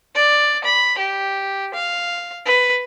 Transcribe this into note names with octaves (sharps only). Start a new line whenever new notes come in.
D5
B5
G4
F5
B4